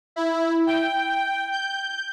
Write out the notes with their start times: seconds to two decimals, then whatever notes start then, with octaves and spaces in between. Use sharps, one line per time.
0.16 E4
0.67 G5
1.52 G6